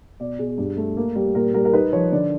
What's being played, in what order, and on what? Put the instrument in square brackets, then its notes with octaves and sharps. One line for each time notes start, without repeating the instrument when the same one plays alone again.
[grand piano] B2 D5
B2 G#4
G2
A3
A#3
G3
A#2 A#4
G3 A#4
A#4
D#4 B4
F3 C#5
D3 D5